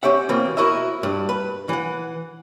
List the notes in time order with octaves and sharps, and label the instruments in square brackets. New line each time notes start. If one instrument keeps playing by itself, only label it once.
[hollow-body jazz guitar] C4 C#4 G4 E5 F#5
B2 E3 A#3 C4
E4 F#4 A#4 D#5 E5
G2
B4
E3 F#5